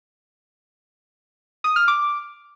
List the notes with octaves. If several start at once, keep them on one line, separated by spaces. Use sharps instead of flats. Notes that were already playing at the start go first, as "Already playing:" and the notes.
D#6
F6
D6